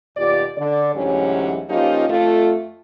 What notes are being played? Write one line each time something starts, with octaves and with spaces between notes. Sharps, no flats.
D#2 B2 F4 G4 D5
D3 D5
D2 G#2 E3 F#3 C#4 G4
F3 A#3 C#4 D#4 F4 G4
F2 A3 F4